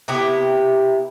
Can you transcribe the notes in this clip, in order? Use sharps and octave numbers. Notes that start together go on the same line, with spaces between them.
C3 B3 E4 G4